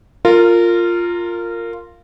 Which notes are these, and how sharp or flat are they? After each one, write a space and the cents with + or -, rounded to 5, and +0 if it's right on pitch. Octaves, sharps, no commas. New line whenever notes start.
F4 +0 A#4 -20